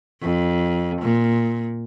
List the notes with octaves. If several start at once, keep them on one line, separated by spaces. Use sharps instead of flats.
F2
A#2